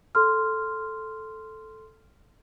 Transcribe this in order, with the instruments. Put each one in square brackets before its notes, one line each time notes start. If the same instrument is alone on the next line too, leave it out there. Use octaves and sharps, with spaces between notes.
[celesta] A4 C6 F6